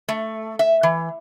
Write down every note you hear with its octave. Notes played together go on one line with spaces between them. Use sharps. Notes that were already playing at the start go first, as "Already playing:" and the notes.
A3
E5
E3